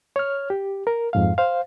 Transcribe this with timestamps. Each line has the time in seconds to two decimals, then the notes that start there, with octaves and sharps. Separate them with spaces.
0.16 C#5 F6
0.50 G4
0.87 A#4
1.13 F2 G#2 F5
1.38 C5 F5